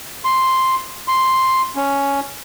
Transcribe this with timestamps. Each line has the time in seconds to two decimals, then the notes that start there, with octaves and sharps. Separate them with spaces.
0.25 C6
1.08 C6
1.76 C#4